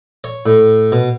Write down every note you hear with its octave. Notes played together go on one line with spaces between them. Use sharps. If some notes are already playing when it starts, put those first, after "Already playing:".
C#5
A2
B2